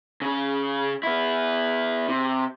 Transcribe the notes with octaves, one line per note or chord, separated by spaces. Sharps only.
C#3 C#4
B3 E4
C3